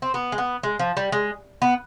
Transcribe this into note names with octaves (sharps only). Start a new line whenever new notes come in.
C4
B3
G#3
B3
G#3
F3
G3
G#3
B3